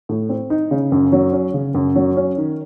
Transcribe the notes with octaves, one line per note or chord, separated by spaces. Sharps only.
A2
C4
D#4
C#3
F#2
F#3
C#4
C#3
F#2
F#3
C#4
D#3